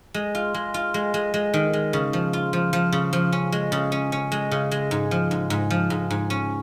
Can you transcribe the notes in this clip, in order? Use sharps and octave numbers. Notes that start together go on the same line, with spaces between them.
G#3
F4
G#3
F4
G#3
G#3
G#3
D#3
G#3
C#3
F3
F4
F3
F3
C#3
F3
C#4
G#3
C#3
C#4
C#4
G#3
C#3
G#3
G#2
F3
G#2
G#2
F3
G#2
G#2
C#4